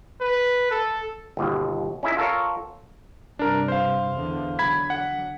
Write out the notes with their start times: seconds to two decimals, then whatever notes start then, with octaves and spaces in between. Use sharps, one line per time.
0.21 B4
0.71 A4
1.37 G1 D#2 B2
2.03 C#4 D#4 E4 G#4 E5
2.17 F4 A4 A#4 C#5
3.39 G2 C3 D4 A#4
3.68 C5 F5
4.15 E2 D3
4.59 D3 F#3 B5 G#6 B6
4.90 F#5